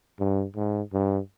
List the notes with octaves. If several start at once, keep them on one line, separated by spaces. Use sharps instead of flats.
G2
G#2
G2